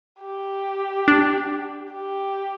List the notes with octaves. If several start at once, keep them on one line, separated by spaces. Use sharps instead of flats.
G4
D4
G4